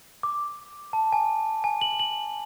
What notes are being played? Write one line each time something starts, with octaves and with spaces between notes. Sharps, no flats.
D6
A5
G#5
G#5
F#7
F#7